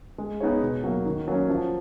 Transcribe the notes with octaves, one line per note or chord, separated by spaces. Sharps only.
G#3
B3 D#4 G#4 C#5
B2
F#3 A#3
D#3
F#3 A#3 C#4
F3